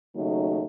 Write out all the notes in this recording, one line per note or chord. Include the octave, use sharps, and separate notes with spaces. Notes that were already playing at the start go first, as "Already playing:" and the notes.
D#2 C#3 F#3 A3 D#4